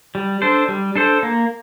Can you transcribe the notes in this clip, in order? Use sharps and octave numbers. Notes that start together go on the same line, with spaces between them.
G3
D4 A4 C5
G3
D4 A4 C5
A#3